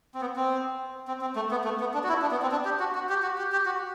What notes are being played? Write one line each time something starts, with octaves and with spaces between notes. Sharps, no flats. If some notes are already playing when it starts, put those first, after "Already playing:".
C4
B3
C4
C4
C4
A3
B3
A3
B3
D4
F#4
E4
D4
B3
C4
D4
G4
F#4
F#4
G4
F#4
G4
G4
F#4